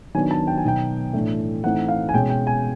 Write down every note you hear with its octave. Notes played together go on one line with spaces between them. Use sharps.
D#3 F#3 B3 D4 G#5
A5
G5
G#5
B2 F#3 B3 D#4 G5
A2 E3 A3 D4
E3 A3 C4 D#4 F#5
F5
G#5
B2 G#3 C#4 G5
G5
G#5